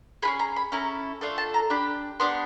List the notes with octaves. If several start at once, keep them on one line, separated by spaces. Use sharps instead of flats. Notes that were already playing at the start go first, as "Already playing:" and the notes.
C#4 F4 G#4 B5
A#5
B5
C#4 E4 A4 A#5
A3 D4 F4 A4
A5
A#5
D4 G4 B5
B3 D4 G4 C6